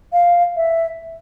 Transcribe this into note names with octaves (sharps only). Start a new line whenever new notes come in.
F5
E5